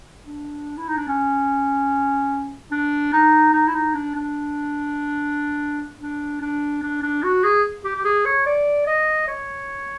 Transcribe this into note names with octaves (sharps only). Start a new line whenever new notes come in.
D4
E4
D#4
D4
C#4
D4
D#4
D#4
E4
D#4
D4
D4
D4
D4
D4
D4
F#4
G#4
G4
G4
G#4
C#5
D5
D#5
C#5